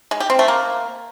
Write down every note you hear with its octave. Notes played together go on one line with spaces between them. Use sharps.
G#3
G4
C4
A3
A#3